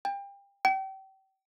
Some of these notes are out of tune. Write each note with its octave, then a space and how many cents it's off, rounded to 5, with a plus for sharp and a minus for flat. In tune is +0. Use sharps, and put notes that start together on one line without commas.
G5 +30
G5 -35